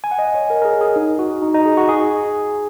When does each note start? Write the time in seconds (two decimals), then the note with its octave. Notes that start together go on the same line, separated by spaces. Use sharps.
0.04 G#5
0.11 F#5
0.19 D#5
0.35 C#5
0.50 A#4
0.62 A#4
0.65 G#4
0.81 G#4
0.96 D#4
1.19 F#4
1.42 D#4
1.54 D#4
1.66 G#4
1.77 F#4
1.89 G#4